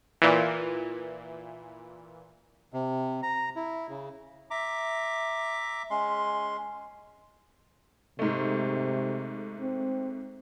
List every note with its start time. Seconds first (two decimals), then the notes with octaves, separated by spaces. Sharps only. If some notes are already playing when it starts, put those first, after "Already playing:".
0.22 A#2 E3
2.73 C3
3.23 A#5
3.56 E4
3.89 C#3
4.51 E5 A#5 D6
5.90 G#3 C#4 C6
8.19 G#2 C3 A3
9.60 C4